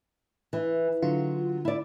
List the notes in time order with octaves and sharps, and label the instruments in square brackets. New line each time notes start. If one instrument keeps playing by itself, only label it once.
[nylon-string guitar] E3
[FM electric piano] D3 F4 [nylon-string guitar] F#3
[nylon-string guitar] E4 D5